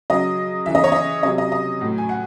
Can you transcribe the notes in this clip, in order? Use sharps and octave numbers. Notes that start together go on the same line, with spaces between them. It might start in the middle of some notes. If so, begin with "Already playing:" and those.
C#3 F#3 D#5
C#3 E3 E5
D#5
C#5
D#5
C3 F#3 D#5
D#5
D#5
A2 F#3
G#5
F#5